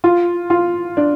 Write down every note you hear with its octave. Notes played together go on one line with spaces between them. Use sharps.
F4
F4
D4